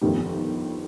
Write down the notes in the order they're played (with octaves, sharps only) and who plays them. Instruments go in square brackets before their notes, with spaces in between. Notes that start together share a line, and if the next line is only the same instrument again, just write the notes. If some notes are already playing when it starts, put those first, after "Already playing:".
[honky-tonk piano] G1 F2 D#3 G3